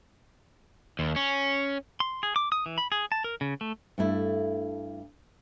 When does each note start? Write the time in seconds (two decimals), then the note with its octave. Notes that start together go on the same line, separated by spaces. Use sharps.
0.99 D#2
1.16 C#4
2.00 C6
2.23 G#4
2.36 D6
2.52 D#6
2.66 E3
2.78 B5
2.92 G#4
3.12 A5
3.24 A#4
3.41 C#3
3.61 A3
3.98 G2 A3 E4